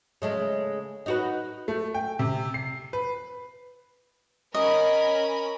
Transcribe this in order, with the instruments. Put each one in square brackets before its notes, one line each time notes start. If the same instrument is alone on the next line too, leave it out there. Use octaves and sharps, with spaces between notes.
[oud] C#3 G#3 A3
D#4 F#4 B4
[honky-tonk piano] A3
G5
C3
C7
B4
[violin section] C#4 A#4 B5 [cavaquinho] D#5